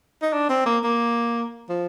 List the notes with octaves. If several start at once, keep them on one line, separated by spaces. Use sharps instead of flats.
D#4
D4
C4
A#3
A#3
F3